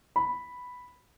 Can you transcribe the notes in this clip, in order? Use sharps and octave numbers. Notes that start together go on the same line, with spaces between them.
B5